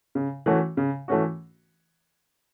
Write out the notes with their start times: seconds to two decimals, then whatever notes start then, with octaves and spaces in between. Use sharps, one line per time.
0.15 C#3
0.46 E3 A3 C#4 F#4
0.77 C#3
1.08 E3 A3 C#4 F#4